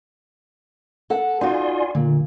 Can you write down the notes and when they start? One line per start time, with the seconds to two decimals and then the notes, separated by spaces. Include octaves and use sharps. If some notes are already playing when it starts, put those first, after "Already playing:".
1.10 A4 F#5
1.41 D#4 F4 F#4 D5 G#5 C6
1.95 A#2 D3